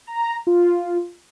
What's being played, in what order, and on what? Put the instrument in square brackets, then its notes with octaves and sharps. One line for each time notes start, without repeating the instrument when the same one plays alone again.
[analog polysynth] A#5
F4